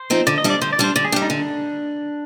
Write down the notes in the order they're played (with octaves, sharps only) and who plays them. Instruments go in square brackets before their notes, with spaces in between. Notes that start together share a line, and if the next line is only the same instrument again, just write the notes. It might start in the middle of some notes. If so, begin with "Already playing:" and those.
Already playing: [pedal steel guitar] C5
[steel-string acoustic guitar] F3 C4 D#4
[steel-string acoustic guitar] D3 [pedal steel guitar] D5
[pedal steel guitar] D#5
[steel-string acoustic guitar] G3 D4
[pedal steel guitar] D5
[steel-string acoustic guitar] D3 [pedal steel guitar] C5
[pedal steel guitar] D5
[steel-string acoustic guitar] G3 D4 [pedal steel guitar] C5
[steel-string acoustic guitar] D3 [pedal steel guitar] D5
[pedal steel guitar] G#4
[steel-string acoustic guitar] G3 D4 [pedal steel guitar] G4
[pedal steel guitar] D#4
[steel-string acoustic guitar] D3 [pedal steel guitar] D4